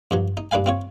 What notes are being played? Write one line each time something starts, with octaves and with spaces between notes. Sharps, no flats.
G2 F3 F#3
D#4
G2 D4 B4 F5 G#5
C4 F4 C#5